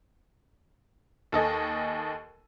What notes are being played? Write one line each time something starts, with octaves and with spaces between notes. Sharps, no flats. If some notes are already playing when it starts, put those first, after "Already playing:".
D#2 A4 D#5 G#5